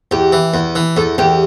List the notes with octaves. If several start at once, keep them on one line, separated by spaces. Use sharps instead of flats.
E2 G4
E3
E2
E3
E2 A4
E2 G4